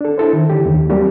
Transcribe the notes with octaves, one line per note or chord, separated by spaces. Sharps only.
D4 A4
E4 A4 C5
D#3
D3 E3 G4
D#2
F#3 G3 A#3 C4 G4